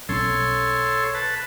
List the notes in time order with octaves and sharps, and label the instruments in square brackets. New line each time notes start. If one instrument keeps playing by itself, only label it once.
[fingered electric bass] B1 C#4 [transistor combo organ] A4 C#5 C6
[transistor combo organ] B4 A5